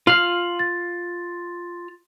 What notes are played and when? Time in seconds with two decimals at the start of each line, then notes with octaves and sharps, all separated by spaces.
0.07 F4 F5 F6 F#7
0.59 A6